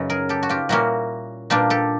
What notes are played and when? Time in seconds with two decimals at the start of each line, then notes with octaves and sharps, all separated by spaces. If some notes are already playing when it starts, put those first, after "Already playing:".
Already playing: F#2 C#3 F#3 D#5
0.10 G#4 A#4
0.29 G4 A4
0.43 F#4
0.49 F4 G4
0.69 A#2 G3 A#3 C#4 E4 F#4
1.50 A#2 G3 A#3 D4 F4 G4
1.70 G4 A4